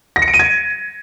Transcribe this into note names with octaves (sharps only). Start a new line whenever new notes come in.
A#6
C#7
D7
D#7
G#6